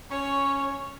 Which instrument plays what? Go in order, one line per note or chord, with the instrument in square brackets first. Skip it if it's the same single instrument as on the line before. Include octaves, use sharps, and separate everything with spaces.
[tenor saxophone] C#4 [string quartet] C#5